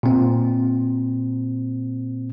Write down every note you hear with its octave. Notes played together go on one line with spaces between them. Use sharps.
A#2 C4